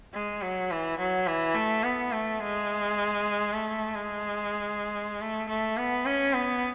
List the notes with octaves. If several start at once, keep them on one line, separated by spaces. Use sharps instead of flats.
G#3
F#3
E3
F#3
E3
A3
B3
A3
G#3
A3
G#3
A3
A3
B3
C#4
B3